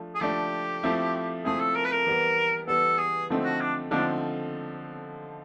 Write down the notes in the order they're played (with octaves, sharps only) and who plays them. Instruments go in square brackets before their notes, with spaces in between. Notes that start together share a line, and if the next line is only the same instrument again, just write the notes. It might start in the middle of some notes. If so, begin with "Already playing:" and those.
Already playing: [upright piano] F3 A3 D4
[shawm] G#4
[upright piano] F3 A3 D4 [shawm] G4
[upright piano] F3 A3 C4 E4
[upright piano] F3 A3 C4 E4 [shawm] G#4
[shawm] A4
A#4
B4
A#4
[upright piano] E3 G3 B3
[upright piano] E3 G3 B3 [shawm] A4
[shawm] G#4
[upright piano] D3 F3 A3 C4 D#4
[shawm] F#4
D4
[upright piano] D3 F3 A3 C4 D#4 [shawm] D4